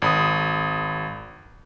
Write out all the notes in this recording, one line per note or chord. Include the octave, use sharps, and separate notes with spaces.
G#1 B5 D#6